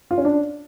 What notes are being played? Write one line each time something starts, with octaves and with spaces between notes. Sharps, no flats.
F4
C#4
D4